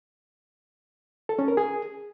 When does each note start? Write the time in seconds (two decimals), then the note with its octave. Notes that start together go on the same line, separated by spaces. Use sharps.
1.29 A4
1.39 C#4
1.48 A#4
1.57 G#4